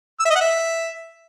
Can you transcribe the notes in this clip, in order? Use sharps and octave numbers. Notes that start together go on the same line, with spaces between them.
E6
E5
D#5
F#5
E5